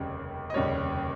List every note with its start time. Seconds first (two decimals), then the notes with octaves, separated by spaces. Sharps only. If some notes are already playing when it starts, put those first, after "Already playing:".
Already playing: F1 D#2 C#3 G3
0.50 D#5
0.54 F1 D#2 C#3 G3 C#5